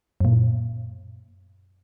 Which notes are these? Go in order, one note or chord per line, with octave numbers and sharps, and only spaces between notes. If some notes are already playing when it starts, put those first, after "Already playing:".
F#2 A#2